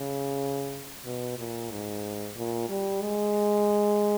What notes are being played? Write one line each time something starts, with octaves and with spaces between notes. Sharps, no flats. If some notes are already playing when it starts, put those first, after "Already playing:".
Already playing: C#3
B2
A#2
G#2
A#2
G3
G#3